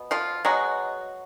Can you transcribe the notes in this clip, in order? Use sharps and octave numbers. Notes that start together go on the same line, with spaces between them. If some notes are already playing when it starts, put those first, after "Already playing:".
Already playing: B2 B3
F3 F4
B2 F#3 G#3 B3 F#4